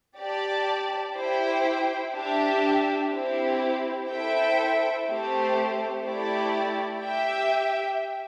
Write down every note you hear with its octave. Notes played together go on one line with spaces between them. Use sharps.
G4 D5 A5
E4 G4 C5 G5
D4 G4 E5
C4 E4 G4
E4 A4 C5 E5 G5
A3 C4 G4 C5
A3 E4 G4 D5
G4 E5 G5